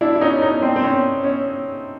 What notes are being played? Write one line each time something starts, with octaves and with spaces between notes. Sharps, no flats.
D4 E4
E4
C#4 D#4
C#4 D#4
C4 D4
C4
C#4
C#4